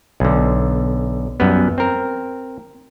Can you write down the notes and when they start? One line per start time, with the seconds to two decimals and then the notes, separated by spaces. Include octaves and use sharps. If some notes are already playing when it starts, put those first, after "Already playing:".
0.20 B1 D3
1.40 F#2 G3 B3
1.78 C4 A#4